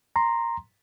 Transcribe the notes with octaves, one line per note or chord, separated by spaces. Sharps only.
A#5 C6